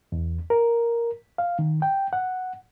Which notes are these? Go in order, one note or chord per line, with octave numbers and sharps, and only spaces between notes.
E2
A#4
F5
D#3
G5
F#5